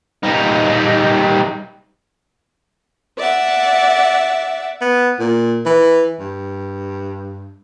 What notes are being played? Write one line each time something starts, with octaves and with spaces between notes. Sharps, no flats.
G3 D#4
D5 E5 F#5
B3
A#2
E3
G2